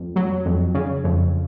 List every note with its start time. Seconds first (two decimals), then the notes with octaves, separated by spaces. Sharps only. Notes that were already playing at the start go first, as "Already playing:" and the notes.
Already playing: F2
0.16 F#3
0.46 F2
0.74 C#3
1.04 F2